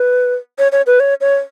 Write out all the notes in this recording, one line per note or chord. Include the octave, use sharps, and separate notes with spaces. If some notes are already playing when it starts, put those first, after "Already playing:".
Already playing: B4
C#5
C#5
B4
C#5
C#5